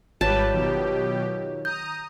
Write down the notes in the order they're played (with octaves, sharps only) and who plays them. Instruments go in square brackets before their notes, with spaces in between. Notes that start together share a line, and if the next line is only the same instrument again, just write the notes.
[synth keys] G#1 [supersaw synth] G3 G4 B4 [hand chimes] F4 C#5 [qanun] A5
[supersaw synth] B2 G4 [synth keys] D#3 F#3
[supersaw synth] A#5 D#6 [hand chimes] G6